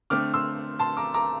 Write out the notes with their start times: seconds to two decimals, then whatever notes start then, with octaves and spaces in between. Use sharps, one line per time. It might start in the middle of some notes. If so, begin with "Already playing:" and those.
0.10 D3 A3 C4 D6 F6
0.34 C6 E6
0.79 A5 C6
0.97 A#5 D6
1.14 A#5 D6